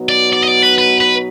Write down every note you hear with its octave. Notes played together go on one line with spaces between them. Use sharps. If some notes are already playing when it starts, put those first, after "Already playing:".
Already playing: B2 F#3 B3 D#4 F#4
D5
D5
D#5
D5
B4
B4
B4